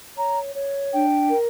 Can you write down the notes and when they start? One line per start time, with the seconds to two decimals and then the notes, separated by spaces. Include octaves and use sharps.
0.17 C#5 A#5
0.55 C#5
0.92 D4 G5
1.29 A#4